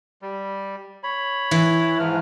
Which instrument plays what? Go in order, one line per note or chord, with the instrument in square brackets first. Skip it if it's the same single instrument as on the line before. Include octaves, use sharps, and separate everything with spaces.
[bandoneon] G3
C#5 B5
[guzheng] E3
[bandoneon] G#2 F3 F6